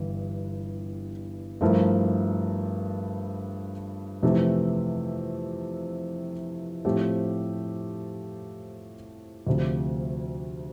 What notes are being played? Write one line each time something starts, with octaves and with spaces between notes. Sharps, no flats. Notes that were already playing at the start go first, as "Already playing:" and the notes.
Already playing: G1 G2 E3
G2 F3 A3 E4 A#4
F2 C3 E3 A3
A2 F3 A3 C4 G4
D2 C3 F3 A3